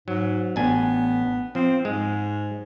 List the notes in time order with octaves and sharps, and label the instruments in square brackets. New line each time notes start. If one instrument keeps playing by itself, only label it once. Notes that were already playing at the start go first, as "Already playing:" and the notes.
[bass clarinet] G#2 [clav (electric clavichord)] F#3
[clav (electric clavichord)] A1 D4 G#5 [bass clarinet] B3
[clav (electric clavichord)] F3 [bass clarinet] C4
[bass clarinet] G#2 [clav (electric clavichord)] G#3